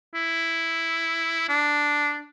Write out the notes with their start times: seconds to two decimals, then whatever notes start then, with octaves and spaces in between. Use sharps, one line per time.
0.14 E4
1.49 D4